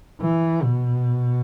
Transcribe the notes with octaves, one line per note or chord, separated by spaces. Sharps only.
E3
B2